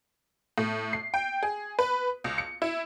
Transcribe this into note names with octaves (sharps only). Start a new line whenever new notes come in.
A2
C7
G5
G#4
B4
C#2
C#7
E4